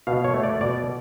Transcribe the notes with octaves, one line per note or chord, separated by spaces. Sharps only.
B2 F5
C#5
A3
D5
B2 D5